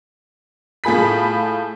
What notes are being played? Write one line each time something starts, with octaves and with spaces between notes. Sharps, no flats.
A2 F4 G#4 B5 B6